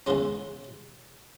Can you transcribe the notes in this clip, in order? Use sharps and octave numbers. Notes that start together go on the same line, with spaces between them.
E2 C#3 E3 G#3 C#4 C6